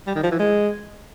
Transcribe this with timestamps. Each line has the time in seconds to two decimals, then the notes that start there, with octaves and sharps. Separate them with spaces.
0.07 G3
0.15 D#3
0.23 F3
0.31 E3
0.39 G#3